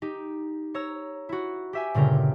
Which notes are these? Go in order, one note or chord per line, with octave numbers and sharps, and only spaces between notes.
D#4 G4
C#5 A#5 E6
E4 F#4
G4 E5 G#5
G1 A#2 C#3 A#4 G5